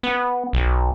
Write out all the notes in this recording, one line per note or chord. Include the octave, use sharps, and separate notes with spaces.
B3
B1